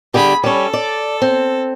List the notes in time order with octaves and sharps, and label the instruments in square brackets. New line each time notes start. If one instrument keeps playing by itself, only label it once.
[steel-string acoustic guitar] D3 G3 G4 [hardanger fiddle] G#4 B5
[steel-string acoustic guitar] G3 C#4 [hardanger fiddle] A4
[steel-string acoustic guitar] D5
C4